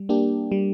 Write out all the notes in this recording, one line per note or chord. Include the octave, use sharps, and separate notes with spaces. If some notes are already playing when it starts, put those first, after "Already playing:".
Already playing: G3
A#3 D4 G4
G3